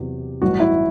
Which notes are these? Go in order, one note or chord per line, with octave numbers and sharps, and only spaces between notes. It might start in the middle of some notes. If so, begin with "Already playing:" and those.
Already playing: E2 C3 F#3 G4
A1 G2 F#3 F#4
E4